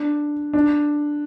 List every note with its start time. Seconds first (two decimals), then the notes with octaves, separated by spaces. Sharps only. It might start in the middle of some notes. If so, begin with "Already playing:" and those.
Already playing: D4
0.53 D4